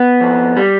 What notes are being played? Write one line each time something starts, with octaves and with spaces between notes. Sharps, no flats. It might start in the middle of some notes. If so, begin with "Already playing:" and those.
Already playing: B3
F2
G3